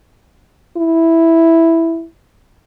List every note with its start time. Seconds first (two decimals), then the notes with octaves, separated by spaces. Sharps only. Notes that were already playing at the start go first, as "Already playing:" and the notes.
0.77 E4